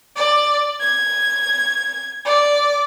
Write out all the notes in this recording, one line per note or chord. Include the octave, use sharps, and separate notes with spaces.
D5
G#6
D5